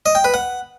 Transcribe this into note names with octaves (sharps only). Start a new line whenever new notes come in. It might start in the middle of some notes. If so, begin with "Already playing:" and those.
D#5
G5
B4
F#5